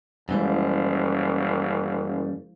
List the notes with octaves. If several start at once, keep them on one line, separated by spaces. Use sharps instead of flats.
F#1 F#2 E3 F3 G3 G#3 E4